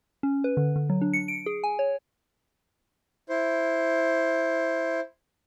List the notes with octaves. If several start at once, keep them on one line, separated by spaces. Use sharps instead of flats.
C#4
B4
D3
D3
F#3
D4
C#7
D7
G#4
G#5
C#5
E4 C5